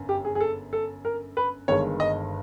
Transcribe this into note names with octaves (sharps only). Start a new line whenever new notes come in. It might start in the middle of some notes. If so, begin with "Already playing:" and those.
Already playing: G1 F#2
G4
G#4
G#4
A4
A4
A#4
B4
G1 G2 D#3 G#3 C#5
D#5